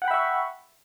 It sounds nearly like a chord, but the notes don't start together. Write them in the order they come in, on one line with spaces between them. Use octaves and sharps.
F#5 G5 B5 E5 C#6